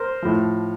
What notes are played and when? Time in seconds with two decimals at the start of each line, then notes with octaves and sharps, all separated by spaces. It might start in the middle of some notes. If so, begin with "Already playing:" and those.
Already playing: A#4 C5
0.23 A2 F3